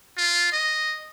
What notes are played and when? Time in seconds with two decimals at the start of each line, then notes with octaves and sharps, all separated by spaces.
0.17 F4
0.53 D#5